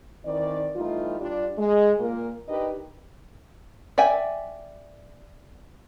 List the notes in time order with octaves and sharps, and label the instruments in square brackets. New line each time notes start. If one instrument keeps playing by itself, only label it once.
[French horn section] D#3 E3 C4 D5
E3 G3 A3 D#4 F4
G2 D4 F4 G4 D5
G#3
A#2 A#3 A#4
D4 D#4 G4 A#4 B4 D#5
[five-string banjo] D5 E5 G5 G#5